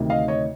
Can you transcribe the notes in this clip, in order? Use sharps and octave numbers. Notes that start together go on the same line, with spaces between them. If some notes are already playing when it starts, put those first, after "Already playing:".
Already playing: D2 C3 D#3
D#5 F5
C#5 D#5